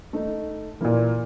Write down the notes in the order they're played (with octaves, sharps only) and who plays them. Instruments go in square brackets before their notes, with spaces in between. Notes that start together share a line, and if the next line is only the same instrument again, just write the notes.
[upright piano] A3 D#4
[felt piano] A#2 E3 [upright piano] A#3